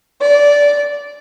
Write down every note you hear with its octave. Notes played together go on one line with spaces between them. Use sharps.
D5